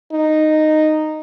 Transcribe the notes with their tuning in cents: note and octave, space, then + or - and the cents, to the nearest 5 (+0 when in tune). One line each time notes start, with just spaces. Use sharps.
D#4 -10